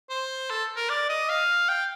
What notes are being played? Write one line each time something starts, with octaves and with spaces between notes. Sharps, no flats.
C5
A4
A#4
D5
D#5
F5
G5